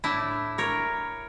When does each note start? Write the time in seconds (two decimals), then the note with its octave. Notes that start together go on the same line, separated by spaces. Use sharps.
0.04 A2 D4 E4
0.58 A#4 C#5